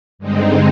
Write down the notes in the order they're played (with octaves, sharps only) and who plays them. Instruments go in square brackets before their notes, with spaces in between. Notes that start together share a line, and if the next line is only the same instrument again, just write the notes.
[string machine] G2 D3 G#3 C4 D#4